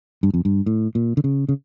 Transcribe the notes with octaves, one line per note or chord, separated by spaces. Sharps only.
G2
F2
G2
A2
A#2
D3
C#3
C#3